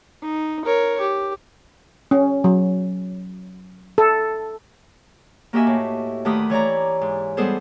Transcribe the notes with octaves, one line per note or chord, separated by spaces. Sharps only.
D#4
A#4 C#5
G4
C#4
F#3
A4
A#3 F#4 G4 D#5 E5 G#5
A2
D2 D#3 A3 G4 B4 D#6
E3 C#5 D5 A#5
G#2
G3 G#3 B3 G#4 A4 C5